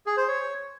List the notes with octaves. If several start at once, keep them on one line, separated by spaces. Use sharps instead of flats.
G#4
C5
C#5